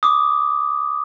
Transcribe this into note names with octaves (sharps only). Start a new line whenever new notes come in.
D6 D#6